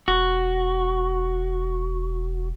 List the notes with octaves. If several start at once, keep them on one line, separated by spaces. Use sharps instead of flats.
E1 F#4